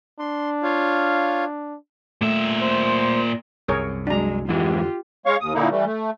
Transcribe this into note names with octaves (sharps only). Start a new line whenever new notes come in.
D4 C6
F4 C#5 F5
A#2 A3 E5
C5
C2 F#2 C3 G#4 A#4 C#5
F#3 G#3 D4 A#5
F2 G#2 D3 E3 G#3 F4 G4
G#3 C#5 F5 C#6
D#2 D#6
A#2 D3 A#3 D#4 E4
E3 G3 A3
A3